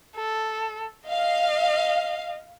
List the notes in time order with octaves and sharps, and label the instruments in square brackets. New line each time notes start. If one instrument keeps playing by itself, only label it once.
[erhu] A4
[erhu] D#5 [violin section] F5